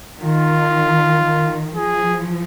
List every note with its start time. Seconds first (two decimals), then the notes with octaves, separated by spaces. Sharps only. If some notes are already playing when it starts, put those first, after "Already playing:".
0.22 D#3 F4
1.24 D#3
1.75 F3 G#4